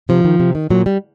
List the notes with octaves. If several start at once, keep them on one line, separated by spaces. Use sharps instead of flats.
C3 F3
D#3
C3
D#3
A#2 F#3
G3